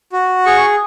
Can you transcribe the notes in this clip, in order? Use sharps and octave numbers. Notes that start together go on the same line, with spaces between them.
F#4
G#4 C#6